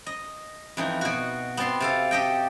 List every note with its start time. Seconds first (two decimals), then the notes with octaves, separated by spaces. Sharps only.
0.06 D#5
0.77 F2 E3 D#4
1.01 B2 F#4
1.57 B3 C4 A5 C6
1.80 C3 A4 F5
2.11 G4 A4 D#5 G5